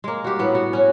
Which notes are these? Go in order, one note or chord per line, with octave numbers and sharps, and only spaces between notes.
G#3 A#3
F#4 G4
A2 B3
F#4
C#4 F#4